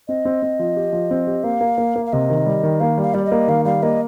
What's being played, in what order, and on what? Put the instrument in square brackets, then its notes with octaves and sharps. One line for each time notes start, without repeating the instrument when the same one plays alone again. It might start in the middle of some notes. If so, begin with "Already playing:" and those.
[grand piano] C4 [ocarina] D#5
[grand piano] C4
C4
F3
G4
F3
C4
G4
[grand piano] A#3 [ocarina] F5
[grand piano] A#3
A#3
A#3
[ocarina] F5
[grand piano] C3 [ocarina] D#5
[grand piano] D#3
G3
D#3
[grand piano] A#3 [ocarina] F5
[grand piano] G3 [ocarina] F5
[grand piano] G3 [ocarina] D5
[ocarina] D#5
[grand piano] A#3
[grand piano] D#3 [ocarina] F5
[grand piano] G3 [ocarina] F5
[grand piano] A#3 [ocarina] D#5